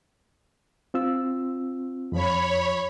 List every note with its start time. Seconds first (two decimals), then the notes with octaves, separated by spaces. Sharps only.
0.94 C4 F4 E6
2.12 F2 F3 C#5 B5